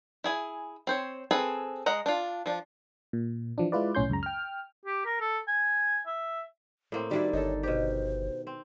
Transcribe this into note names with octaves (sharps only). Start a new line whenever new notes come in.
E4 G#4 G#5
C4 C5 C#5
C4 G#4 A4 B4
G#3 D#5 F#5 A#5
D4 F4
F3 D4
A#2
E3 F3 D4
G#3 E4 F4 B4 D5
B1 A2 C#4 C6 G6
C#2 F#2 C#3 A#5
G5 F6
G4
A#4
A4
G#5
E5
A2 A#3 C4
D#3 G3 D4 E4 F#4
G1 D#4 A4 C#5
B2 G4 C5
C4